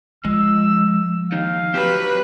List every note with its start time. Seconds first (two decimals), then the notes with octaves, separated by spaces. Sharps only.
0.25 F3 G#3 E6
1.32 D#2 D#4 F5
1.74 F#3 C4 G4 B4